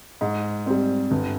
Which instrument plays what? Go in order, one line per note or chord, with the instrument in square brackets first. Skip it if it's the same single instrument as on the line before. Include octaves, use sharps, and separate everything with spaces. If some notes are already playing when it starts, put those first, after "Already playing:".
[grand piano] G#2
G3 C4
G1